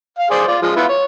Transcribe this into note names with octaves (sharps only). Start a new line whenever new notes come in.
F5
G#4 C5 D5
F4 D5
F3 G#3
B3 E4 F4
C#5